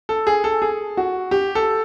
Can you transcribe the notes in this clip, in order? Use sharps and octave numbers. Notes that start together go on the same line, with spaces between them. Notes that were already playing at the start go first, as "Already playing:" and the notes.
A4
G#4
A4
G#4
F#4
G4
A4